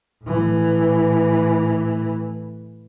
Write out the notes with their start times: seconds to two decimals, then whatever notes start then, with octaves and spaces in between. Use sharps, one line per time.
0.24 A2 E3